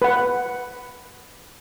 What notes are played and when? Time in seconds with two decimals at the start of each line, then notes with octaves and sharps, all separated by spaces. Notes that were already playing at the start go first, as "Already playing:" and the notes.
0.02 B4 F#5